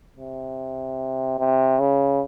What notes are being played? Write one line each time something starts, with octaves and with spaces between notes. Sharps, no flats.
C3
C3
C#3